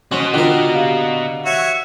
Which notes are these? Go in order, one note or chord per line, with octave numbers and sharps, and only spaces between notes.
C#4 F#4 D#5 C6
D3 F4 A#4 G5
G4 F5
F#4 C#5 E5